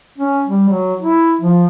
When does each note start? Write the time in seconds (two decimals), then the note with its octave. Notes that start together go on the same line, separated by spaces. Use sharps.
0.18 C#4
0.47 G3
0.69 F#3
1.00 E4
1.42 F3